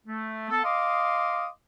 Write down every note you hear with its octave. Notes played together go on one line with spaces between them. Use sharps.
A3
B3 A4
D#5 F5 C6 D6 D#6